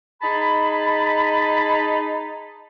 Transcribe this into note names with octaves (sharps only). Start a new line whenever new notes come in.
D#4 G#4 A5 B5